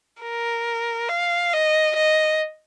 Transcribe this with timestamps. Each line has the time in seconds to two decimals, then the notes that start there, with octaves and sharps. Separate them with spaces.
0.22 A#4
1.09 F5
1.53 D#5
1.96 D#5